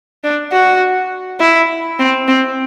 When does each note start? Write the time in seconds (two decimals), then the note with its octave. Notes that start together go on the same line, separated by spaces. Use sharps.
0.24 D4
0.52 F#4
1.40 E4
1.99 C4
2.28 C4